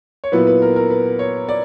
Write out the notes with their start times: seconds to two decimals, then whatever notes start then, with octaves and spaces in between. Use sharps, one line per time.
0.24 C#5
0.32 A#2 F#3 B3 E4 B4
0.47 B4
0.62 A#4
0.76 A#4
0.90 B4
1.19 C#5
1.49 D5